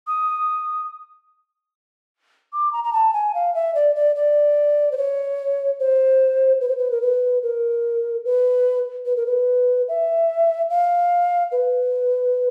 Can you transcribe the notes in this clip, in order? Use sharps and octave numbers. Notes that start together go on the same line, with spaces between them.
D#6
D6
A#5
A#5
A5
G#5
F5
E5
D5
D5
D5
C5
C#5
C5
B4
C5
B4
A#4
B4
A#4
B4
B4
A#4
B4
E5
F5
B4